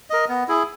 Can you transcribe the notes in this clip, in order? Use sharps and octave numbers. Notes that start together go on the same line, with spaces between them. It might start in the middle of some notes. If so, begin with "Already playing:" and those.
A#4 D#5
B3
E4 G#4